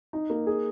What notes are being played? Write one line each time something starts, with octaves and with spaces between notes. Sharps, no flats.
D#4
A#3
G#4